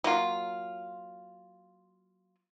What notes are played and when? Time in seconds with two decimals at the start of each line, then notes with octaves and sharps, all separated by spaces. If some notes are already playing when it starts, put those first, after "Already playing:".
0.04 F#3 A#3 F4